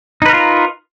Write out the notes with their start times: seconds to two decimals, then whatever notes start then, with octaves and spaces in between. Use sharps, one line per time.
0.22 D#4
0.26 B4
0.29 A#4
0.33 F4